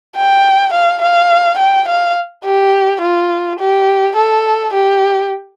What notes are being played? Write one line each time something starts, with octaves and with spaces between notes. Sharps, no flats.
G5
F5
F5
G5
F5
G4
F4
G4
A4
G4